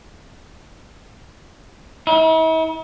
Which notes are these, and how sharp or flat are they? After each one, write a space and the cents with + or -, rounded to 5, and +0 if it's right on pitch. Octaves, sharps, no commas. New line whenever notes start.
E4 -45